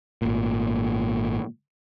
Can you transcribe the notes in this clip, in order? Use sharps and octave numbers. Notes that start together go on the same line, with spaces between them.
G#1 A#2